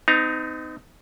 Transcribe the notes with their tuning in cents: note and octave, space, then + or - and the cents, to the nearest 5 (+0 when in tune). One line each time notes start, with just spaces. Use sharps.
C4 -45 D#4 +0 A#5 +0